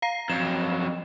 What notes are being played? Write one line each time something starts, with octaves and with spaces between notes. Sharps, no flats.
F5 A#5 C7
F2 F#3 E7